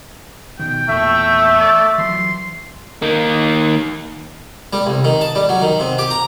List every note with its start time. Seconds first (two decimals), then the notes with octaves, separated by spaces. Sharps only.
0.59 B2 D#3 G5
0.89 E2 A#2 A3 E5
1.59 D5
1.98 E3 F#3 C6
3.02 D#3 A#3
4.73 G3
4.86 C2
5.04 D#3
5.21 A5
5.35 G3
5.49 F#3
5.62 D#3
5.80 C3
5.99 G4
6.10 A#5